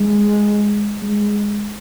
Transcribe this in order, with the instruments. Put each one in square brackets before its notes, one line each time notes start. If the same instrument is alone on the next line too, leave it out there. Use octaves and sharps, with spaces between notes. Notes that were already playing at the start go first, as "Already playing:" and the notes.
Already playing: [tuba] G#3
G#3